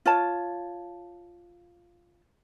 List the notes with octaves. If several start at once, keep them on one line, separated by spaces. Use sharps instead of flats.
F4 C#5 A5